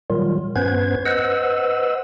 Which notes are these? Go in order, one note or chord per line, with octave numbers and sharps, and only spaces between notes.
A#2 D#3 F#3 G3 F4
G2 B3 C#4 B4 C5 G#6
B4 C5 D#5 F#5 E6